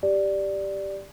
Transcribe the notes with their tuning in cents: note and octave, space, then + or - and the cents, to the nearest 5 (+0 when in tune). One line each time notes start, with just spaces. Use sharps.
G4 +0 D5 +0